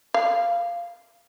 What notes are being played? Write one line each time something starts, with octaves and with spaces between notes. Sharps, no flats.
F5